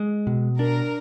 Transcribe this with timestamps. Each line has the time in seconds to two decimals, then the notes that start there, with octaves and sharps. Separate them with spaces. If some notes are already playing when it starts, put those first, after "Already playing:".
Already playing: G#3
0.27 B2
0.59 D4 A#4